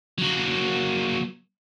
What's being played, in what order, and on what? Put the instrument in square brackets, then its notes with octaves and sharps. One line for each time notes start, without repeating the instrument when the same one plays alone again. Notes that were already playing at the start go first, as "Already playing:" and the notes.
[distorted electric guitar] F#3 A#3